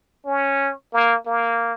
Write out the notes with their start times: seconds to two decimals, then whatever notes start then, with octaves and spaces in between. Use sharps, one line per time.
0.26 C#4
0.93 A#3
1.27 A#3